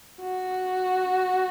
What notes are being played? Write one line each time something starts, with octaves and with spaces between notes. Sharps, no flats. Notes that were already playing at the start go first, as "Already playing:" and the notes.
F#4